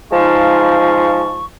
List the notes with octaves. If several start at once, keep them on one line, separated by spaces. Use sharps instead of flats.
F3 G#3 D#4 F5 A5 C#6